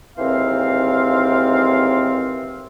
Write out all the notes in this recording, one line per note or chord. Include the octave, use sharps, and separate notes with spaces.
D#2 G#2 E3 C4 F5 C6